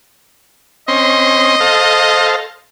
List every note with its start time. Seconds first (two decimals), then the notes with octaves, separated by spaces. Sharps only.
0.88 C4 C#4 D#5 C6
1.60 A4 C5 F5